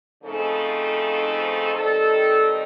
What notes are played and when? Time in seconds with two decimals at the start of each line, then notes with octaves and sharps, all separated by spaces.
0.23 C#3 F3 A3 C4 D#4 A4
1.72 D#3 G3 C4 D#4 A4